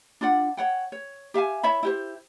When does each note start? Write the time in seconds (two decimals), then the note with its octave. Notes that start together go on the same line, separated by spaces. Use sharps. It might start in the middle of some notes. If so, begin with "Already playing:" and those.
0.21 D4 F4 D5 F#5
0.57 C#5 F#5 G5
0.92 C#5
1.34 G4 E5 F5 G#5
1.63 E4 C#5 E5 B5
1.83 E4 G4 C5